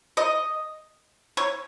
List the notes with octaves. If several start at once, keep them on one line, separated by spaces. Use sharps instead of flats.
D#5
C#5